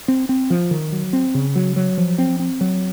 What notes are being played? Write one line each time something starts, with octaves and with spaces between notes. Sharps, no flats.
C4
C4
F3
D#3
F#3
C4
C#3
F#3
F#3
F3
C4
C4
F#3